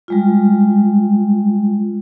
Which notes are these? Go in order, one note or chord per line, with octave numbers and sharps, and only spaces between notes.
G3 G#3 F4